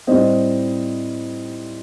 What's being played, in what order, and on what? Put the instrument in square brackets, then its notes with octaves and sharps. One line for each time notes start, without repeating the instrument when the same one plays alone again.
[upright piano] A2 G3 C4 C5 D#5